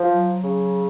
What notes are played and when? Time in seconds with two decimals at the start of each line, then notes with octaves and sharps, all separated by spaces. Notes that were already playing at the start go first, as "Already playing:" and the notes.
Already playing: F3
0.10 F#3
0.44 C#3